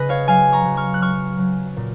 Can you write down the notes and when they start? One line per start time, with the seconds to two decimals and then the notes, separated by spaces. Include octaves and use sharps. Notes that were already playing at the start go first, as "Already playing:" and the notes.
Already playing: C#3 B4 D#5
0.09 C#5 F5
0.28 F#3 F5 G#5
0.52 A#5 C#6
0.65 F#3
0.77 C#6 F6
0.94 F#6
1.02 F#3 C#6 F6
1.39 F#3
1.77 A#2